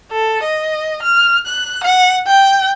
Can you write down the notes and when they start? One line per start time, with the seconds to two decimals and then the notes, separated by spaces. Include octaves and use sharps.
0.12 A4
0.43 D#5
1.03 F6
1.46 F#6
1.84 F#5
2.27 G5